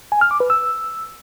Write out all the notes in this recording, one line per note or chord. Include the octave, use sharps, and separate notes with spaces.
G#5
F6
D6
B4
E6